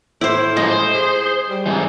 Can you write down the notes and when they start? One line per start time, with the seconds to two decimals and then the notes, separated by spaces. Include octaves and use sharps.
0.21 A2 E4 C5
0.57 G#2 F3 D#5
0.70 C5
0.94 G#4
1.49 G3
1.66 G#2 E3